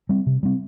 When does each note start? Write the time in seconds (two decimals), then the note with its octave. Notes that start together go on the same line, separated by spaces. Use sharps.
0.09 G3 C4
0.26 C3
0.43 G3 C4